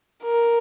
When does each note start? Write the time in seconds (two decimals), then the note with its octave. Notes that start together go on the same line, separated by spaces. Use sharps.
0.24 A#4